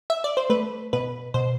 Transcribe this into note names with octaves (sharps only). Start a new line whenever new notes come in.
E5
D5
C5
A3 B4
B2 B4
B2 C5